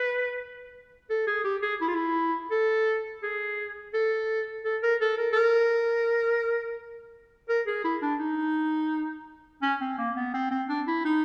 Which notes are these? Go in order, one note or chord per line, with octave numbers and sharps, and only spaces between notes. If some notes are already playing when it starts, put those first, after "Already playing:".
Already playing: B4
A4
G#4
G4
G#4
E4
F4
E4
A4
G#4
A4
A4
A#4
A4
A#4
A4
A#4
A#4
G#4
E4
D4
D#4
C#4
C4
A#3
B3
C4
C4
D4
E4
D#4